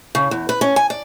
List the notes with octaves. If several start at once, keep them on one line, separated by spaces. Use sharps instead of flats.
C#3
E2
B4
C#4
G#5
D5